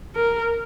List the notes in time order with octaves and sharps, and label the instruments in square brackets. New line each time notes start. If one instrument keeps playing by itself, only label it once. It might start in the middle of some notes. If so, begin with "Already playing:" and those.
[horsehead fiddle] A#4